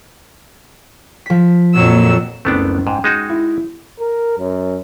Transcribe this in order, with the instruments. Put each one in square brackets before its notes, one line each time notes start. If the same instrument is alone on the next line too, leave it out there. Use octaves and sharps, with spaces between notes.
[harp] F3 B6
[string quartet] F2 F#3 E6 [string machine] A#2
[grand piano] F#1 C#2 C4 [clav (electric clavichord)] A3 B3 D4
[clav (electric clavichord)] G#2 [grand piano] G5
[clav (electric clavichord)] G#3 D#4 F#4
[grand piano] E4
[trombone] A#4
F#2